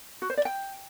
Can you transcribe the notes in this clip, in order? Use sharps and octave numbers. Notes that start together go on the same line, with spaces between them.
F#4
C5
D5
G5